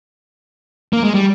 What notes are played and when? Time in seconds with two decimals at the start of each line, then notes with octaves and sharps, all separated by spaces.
0.93 A#3
1.04 G#3
1.14 G3